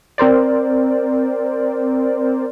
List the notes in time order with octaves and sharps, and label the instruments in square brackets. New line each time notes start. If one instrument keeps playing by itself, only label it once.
[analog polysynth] C4 A#4 C5 D5